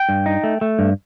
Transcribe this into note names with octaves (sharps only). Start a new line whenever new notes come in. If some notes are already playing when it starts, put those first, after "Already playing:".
Already playing: G5
G2
D#4
A3
A3
G2